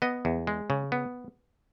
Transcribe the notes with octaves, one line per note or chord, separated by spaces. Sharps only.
B3 D#5
E2
G#3
C#3
B3